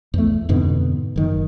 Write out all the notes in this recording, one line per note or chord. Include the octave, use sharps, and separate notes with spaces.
E2 A3
F2 G#2 B2 D3
F#1 D#3